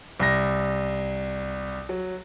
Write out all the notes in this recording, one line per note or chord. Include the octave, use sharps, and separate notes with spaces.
C2 A#6
F#3